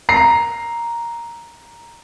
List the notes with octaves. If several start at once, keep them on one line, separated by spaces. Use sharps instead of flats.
A#5 C7